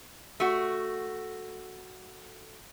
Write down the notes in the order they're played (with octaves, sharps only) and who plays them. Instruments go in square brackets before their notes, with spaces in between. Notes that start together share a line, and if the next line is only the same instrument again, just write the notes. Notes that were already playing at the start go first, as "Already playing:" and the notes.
[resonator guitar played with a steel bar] A3 F#4